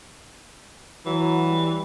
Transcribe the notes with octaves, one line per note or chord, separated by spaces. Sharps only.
E3 F#3
G3